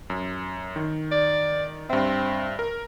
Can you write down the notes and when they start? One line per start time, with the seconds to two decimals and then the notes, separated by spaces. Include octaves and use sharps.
0.10 F#2
0.76 D#3
1.12 D5
1.89 G2 C4 E5
2.59 A#4